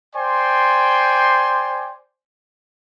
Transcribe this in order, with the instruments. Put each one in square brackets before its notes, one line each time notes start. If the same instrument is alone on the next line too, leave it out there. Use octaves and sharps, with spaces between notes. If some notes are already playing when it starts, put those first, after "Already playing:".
[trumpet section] C5 D5 G5 G#5 C6